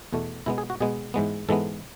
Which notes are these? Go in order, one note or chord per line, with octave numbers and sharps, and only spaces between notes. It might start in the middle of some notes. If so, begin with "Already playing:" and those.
E2 B2 A3
B2 G#3 B3 E4
G#4
F#4
B2 G#3 B3 G#4
G#2 E3 G#3 B3
G#2 E3 G#3 B3 A4